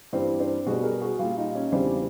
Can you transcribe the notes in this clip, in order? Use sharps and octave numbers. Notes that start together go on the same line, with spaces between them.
G2 E3 G3 C4 D4
C4 D4
B2 G3 F#4 G#4
G#4 A#4
F#4 G#4
A#2 G3 F4 G4
D#4 F4
C#4 D#4
E2 C#3 E3 G3 C4 D4